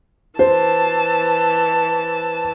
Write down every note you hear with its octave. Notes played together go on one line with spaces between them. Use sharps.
E3 C5 A5